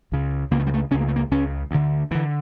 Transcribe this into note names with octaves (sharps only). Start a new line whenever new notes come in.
C#2 C#3
C#2 C#3 A#3
A3
G3
A3
C#2 C#3 C#4
A#3
A3
A#3
C#2 C#3 C#4
D2 D3
D2 D3 E3